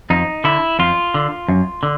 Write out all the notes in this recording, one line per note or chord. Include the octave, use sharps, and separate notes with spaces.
F2 D#4
D3 E4
F2 F4
D3
F#2
D3